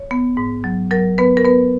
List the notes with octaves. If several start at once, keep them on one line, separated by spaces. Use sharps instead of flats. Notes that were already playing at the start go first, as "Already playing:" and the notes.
Already playing: C#5
B3
G#2
F#3
F#3 A#4
B3 B4
A#4
B3 B4